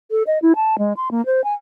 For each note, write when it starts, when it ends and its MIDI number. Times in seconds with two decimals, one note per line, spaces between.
0.11 0.23 69
0.27 0.39 75
0.42 0.53 64
0.56 0.78 81
0.78 0.93 56
0.97 1.11 84
1.11 1.24 58
1.26 1.44 72
1.44 1.54 80